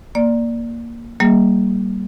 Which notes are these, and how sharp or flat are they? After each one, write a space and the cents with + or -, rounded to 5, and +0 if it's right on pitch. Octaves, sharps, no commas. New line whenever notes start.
A#3 +0 D5 +0
G3 -20 A#3 +0 G#4 +0